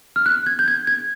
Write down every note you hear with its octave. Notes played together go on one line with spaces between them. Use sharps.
F6
F#6
G#6
G6
G#6
G#6